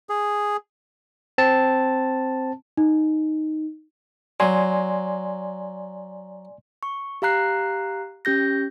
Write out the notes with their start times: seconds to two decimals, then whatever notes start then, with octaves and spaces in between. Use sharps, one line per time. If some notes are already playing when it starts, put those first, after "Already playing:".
0.09 G#4
1.38 C4 A5
2.77 D#4
4.40 F#3 D5 G#5 C6
6.83 C#6
7.22 G4 F5 A#5 F#6 C7
8.25 C#4 G4 G6 A#6